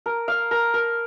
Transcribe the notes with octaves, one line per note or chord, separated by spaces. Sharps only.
A#4
F5
A#4
A#4